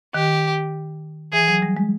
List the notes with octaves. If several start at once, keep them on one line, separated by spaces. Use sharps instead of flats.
D#3 G4
E3 G#4
F#3
G3
G#3